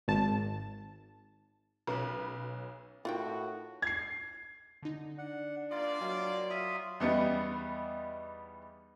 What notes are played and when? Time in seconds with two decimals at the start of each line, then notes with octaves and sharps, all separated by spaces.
0.08 G#1 A5
1.87 B1 C#4 B4 B5
3.05 A2 D#4 F4 F#4 A#4 F#5 G5
3.82 G#6 C7
4.82 D3 D#4
5.18 D4 F#5
5.71 G3 A#3 F4 D5
6.01 F#3 A#4 D#5 G#5
6.50 F4 E5 A#5 C#6 D#6 F6
7.00 E2 G3 B3 D#4